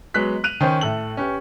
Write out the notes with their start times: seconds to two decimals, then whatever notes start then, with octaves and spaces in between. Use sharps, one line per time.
0.14 F#3 G#3 B3 F#6 B6
0.44 F#6 D#7 F7
0.61 D#3 C#4 C5
0.81 A2 A4 F#7
1.17 C#4 G4 B4